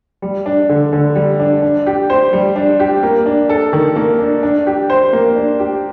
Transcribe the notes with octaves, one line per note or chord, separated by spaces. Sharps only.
G3
D4
D3
D3
G3
D4
D4
G4
C5
G3
D4
G4
A#3
D4
A4
D#3
A#3
D4
D4
G4
C5
A#3
D4
G4